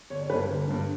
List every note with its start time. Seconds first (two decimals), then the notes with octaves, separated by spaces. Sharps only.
0.10 G1 C#5
0.20 D5
0.30 D3 B4
0.32 G2
0.39 A#4
0.48 G1
0.68 G2 D3